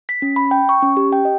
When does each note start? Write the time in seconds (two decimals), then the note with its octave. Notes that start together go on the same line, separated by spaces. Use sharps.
0.09 B6
0.22 C#4
0.36 B5
0.51 G5
0.69 C#6
0.82 C#4
0.97 G4
1.13 G5
1.25 D#5